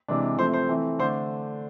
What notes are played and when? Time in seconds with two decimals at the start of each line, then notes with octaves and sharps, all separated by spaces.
0.08 C3 E3 G#3 D4
0.38 C3 F3 A3 C4 C5
0.53 C5
0.69 E3 A3 C4
0.99 D3 A3 D4 C5